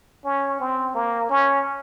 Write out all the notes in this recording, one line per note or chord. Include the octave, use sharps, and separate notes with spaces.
C#4
C4
A#3
C#4